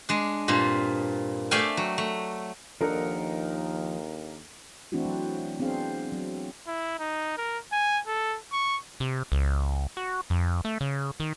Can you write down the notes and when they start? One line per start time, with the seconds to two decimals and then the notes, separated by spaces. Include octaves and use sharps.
0.09 G#3 D4
0.48 G2 A#2 C4 F4
1.51 A3 D5 E5 F5 G5 G#5
1.77 F#3
1.98 A3
2.81 D#2 F3 D4 D#4 A4 A#4 F#5
4.92 E3 A3 C4 D4 E4 F#4
5.05 F#3
5.60 B3 C4 D4 G#4 F5
6.12 F#3
6.67 E4
6.99 D#4
7.37 A#4
7.72 G#5
8.07 A4
8.52 C#6
9.00 C3
9.32 C#2
9.97 F#4
10.30 F2
10.65 A3
10.81 C#3
11.20 D#3